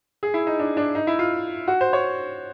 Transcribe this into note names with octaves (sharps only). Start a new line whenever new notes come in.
G#4
E4
D#4
D4
D4
D#4
E4
F4
F#4
C5
C#5